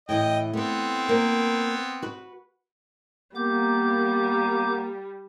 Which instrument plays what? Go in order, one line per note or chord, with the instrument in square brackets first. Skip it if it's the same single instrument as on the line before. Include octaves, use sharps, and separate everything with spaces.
[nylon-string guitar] A2 E3 [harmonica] D#5 G5
[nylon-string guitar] A3 B4 [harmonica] B3 C4
[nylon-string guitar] A#3 A#4 C5
F#4 B4
[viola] G3 [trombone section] A#3 [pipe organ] B3 D6 G6